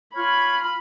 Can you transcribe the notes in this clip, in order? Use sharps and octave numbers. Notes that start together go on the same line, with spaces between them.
F4 C#5 B5 F6